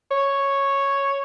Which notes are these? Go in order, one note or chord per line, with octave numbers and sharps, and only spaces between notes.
C#5